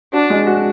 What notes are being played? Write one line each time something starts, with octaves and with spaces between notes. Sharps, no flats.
D4 F#4
G#3
F#4